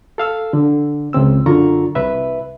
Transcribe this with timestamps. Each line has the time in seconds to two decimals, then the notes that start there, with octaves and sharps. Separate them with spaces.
0.18 A4 F5 E6
0.53 D3
1.13 C#2 C#3 C4 E6
1.46 F#2 D3 F4 A#5 C#6
1.95 C2 B4 E5